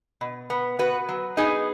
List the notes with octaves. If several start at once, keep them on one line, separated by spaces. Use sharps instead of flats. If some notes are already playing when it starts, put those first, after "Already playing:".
B2
B3
B3 F#4 B4
F#3
B3 D#4 G#4